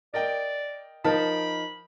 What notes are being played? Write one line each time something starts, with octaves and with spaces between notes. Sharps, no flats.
A#4 D5 D#5 G5
F3 D#4 A#4 A5 B5